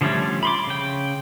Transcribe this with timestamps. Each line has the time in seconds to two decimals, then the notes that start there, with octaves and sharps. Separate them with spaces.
0.01 D3 F3 G3 A3 C#4
0.43 B5 C6 D6
0.67 C#3 G5